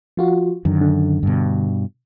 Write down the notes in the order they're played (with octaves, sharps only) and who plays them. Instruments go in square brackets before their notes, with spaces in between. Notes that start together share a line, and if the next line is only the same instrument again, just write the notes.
[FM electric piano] F3 F4 F#4
[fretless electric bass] F#2 D#3 [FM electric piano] D3
[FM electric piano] D3
[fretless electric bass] G2 B2